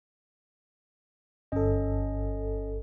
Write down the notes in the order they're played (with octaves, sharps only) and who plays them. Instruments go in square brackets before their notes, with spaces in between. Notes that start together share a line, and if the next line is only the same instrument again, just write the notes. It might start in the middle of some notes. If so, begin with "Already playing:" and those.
[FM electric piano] G1 A4 [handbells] C#4 D#5